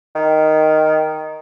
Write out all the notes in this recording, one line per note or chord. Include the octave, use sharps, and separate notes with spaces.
D#3